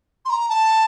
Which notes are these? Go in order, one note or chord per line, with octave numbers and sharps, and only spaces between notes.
C6
A#5
A5